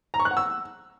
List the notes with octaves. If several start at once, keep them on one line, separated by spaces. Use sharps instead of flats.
A#5
C#6
F#6
F#5
E6